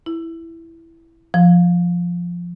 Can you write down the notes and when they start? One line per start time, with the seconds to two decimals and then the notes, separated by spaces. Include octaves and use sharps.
0.06 E4
1.34 F3